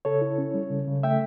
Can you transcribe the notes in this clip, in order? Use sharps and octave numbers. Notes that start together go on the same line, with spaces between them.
C#3 A4 C#5
E4
C#4
G3
C#3
C#3
A3 E5 G5